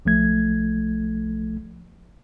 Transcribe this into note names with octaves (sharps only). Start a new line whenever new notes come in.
B1 F3 A3 G#6